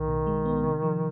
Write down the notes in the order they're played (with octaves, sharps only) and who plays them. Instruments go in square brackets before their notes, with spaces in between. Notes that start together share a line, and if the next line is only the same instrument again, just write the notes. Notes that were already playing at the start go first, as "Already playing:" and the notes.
Already playing: [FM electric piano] B1 A2 [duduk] D#3
[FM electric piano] B2
G#3
B3
C3
F3